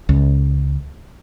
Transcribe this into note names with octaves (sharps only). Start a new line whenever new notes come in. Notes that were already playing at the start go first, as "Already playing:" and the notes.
C#2